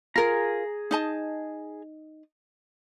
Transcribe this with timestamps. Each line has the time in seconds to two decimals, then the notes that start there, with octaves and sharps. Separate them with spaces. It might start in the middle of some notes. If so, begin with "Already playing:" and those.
0.16 F4 G#4 A#4 A#5
0.91 D#4 D#5 A5